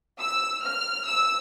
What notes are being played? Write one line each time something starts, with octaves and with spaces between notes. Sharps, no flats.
E6
F6
E6